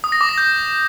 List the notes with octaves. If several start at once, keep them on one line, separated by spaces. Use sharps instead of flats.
D#6
A#6
D6
A#6
G6